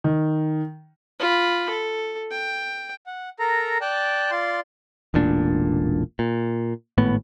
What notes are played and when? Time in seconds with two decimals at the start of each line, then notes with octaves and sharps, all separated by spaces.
0.04 D#3
1.19 F4 B5
1.69 A4
2.32 G5
3.07 F#5
3.39 A4 A#4 A#5
3.81 D5 G5 A5 F#6
4.31 F4 D5 C6
5.14 E1 A1 A#2 D4
6.19 A#2
6.98 G#1 A2 B3